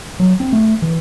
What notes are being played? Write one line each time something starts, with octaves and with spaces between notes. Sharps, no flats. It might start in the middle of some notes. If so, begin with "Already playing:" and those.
F#3
C4
A3
E3